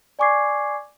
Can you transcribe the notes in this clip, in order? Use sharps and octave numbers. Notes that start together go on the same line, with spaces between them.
D5 G#5 C#6 D6 G#6 C7